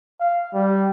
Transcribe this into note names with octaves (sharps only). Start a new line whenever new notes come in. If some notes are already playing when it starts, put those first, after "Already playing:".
F5
G3